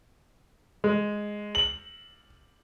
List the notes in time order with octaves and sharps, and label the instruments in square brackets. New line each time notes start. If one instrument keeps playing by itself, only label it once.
[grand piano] G#3
F#7